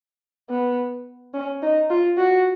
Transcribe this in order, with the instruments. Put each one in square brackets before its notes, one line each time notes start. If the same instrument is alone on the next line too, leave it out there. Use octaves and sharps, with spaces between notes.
[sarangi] B3
C#4
D#4
F4
F#4